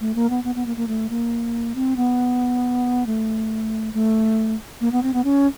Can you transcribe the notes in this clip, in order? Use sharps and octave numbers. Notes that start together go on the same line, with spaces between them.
A3
A#3
B3
B3
B3
A#3
A#3
A3
A#3
C4
B3
A3
A3
A#3
B3
C4
B3
C#4